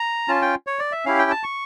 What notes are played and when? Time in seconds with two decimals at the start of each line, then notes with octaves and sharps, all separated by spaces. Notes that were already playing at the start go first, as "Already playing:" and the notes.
Already playing: A#5
0.28 C#4 F4 A5
0.42 G5
0.67 C#5
0.79 D5
0.92 E5
1.05 C#4 E4 G4 F5
1.19 G5
1.31 A5
1.44 C#6